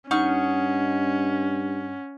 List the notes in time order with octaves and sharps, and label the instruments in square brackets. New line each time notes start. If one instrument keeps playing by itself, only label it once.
[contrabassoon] G2 [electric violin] C#4 [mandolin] D#4 C#6 F6 [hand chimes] F#5